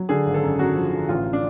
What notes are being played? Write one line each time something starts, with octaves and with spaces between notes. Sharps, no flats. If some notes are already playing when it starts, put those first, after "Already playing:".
Already playing: F#3
D3 G#4
G#1
A4
F#2
F#2 F#4
F3
D3
A1 F4
D4